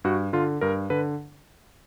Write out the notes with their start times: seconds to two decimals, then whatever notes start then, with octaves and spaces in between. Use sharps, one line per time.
0.04 G2 F#4
0.33 D3 F4
0.61 G2 A#4
0.90 D3 B4